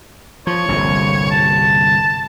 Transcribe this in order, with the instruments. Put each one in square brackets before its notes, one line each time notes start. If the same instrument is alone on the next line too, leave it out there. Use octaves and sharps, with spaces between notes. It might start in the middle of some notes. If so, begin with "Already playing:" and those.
[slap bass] F3 [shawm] C#5
[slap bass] G1 C2 A#2
[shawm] A5